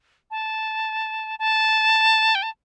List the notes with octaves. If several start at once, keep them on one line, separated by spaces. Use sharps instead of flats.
A5
A5
G5
A5